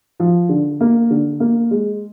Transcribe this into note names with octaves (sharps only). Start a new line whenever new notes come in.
F3
D3
A#3
D3
A#3
G#3